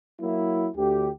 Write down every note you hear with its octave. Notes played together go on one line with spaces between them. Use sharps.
F#3 A#3 E4
D2 G4